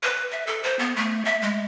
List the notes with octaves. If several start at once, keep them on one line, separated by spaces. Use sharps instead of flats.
B4
E5
A4
C5
B3
A3
E5
G#3